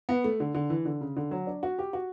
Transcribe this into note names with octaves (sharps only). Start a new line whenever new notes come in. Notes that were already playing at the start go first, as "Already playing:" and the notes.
B3
A3
D3
D3
E3
D3
C#3
D3
F#3
D4
F#4
G4
F#4